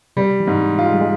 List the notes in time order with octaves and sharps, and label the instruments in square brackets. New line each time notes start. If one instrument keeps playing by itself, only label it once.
[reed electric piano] C3 [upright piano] G3
[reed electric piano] E3
[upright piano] G#2
[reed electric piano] G#3
[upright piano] F4
[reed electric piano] G#3
G3
G#3